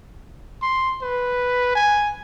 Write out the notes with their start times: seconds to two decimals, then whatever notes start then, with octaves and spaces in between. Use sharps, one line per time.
0.62 C6
1.02 B4
1.75 G#5